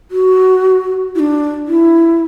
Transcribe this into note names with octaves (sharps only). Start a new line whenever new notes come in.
F#4
E4
D4
E4